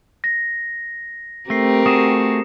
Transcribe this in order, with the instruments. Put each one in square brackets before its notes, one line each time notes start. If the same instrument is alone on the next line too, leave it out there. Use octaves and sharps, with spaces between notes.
[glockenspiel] A#6
[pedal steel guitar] A3 [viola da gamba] C4 G4 A#4 [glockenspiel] A#6 C7
[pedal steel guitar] A3 F#4 G#4 [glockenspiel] D#6 C#7 E7